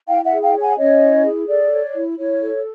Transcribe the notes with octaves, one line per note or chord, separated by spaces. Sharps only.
E4 F5 G5
E5 F#5
G#4
F5 G5
C#5
F#5 G#5
C#4 C#5 D#5
E4
G#4
A4 D5
C#5
E4
E4 C#5
A4